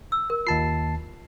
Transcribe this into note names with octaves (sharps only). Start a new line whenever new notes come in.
E6
A#4
D#2 F4 A5 C7